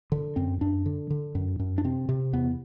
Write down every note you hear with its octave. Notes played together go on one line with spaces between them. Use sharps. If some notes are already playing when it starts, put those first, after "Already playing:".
D3
F#2 C4
F#2 D4
D3
D3
F#2
F#2
D4
C3 C4
C3
E2 B3